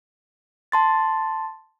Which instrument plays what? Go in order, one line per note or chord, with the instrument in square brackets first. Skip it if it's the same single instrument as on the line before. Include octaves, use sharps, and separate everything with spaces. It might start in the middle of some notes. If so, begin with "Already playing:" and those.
[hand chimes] A5 C6 A6